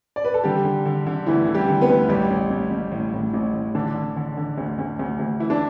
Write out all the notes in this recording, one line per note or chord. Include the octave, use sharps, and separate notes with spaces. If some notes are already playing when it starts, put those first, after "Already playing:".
D5
B4
A4
D3 G3 G4
D3
D3
D3
D2 E3 E4
D3 E4
G3 G4
D3
B3 B4
D2
A1 G3 G4
A1
A1
A1
A2
A2
A1
A2
D3 D4
D3
D3
D3
D2
D2
D2
D2
E3 E4
D4